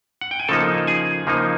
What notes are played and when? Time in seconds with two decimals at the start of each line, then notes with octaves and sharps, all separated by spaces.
0.21 F#5
0.31 G5
0.39 G#5
0.49 C#3 F3 A#3 D#4 A4 A5
0.87 G#4 G#5
1.27 C#3 F3 A#3 D#4